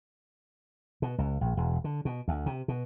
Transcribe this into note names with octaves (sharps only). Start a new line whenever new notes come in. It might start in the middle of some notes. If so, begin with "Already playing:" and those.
B2
C#2
A#1
E1
D3
B2
D2
C3
B2